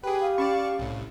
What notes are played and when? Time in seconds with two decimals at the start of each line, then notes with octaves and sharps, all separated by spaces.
0.03 G4 G#4 B4 G5
0.21 F5
0.38 C#4 D5 A5 C#6
0.79 C2 A2